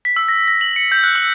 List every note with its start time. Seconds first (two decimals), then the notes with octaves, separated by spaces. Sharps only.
0.05 B6
0.16 E6
0.28 A#6
0.48 A#6
0.61 F#7
0.76 C#7
0.92 G6
1.04 F#6
1.15 E6